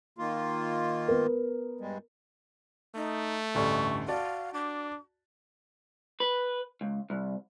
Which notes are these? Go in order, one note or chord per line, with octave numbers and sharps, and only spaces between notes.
D#3 A#3 F4
B3 A#4
G2 G3 G#3
A3 D#4
A1 D2 G2 C#6
F#4 D5 F5 A5
D4 D6
B4
C#2
C2